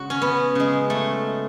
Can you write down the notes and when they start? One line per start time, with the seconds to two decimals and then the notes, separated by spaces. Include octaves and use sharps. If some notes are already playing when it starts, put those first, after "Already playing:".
Already playing: C#3 G#3 F#4
0.10 C#4
0.22 B3
0.55 C#3 G#3
0.90 A3